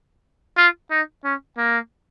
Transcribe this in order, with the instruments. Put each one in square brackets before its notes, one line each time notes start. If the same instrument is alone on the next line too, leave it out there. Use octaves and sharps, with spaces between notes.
[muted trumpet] F4
D#4
C#4
A#3